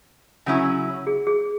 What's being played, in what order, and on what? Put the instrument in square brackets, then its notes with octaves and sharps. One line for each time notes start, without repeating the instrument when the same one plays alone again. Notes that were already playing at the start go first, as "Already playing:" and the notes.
[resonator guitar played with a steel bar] C#3 F#3 C#4 E4
[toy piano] G#4
G#4